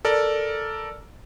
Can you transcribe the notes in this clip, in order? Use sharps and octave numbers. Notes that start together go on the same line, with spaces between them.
A4 A#4 D5